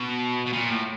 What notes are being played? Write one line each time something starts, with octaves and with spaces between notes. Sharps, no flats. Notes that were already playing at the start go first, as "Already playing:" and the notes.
Already playing: B2
B2
A#2
A2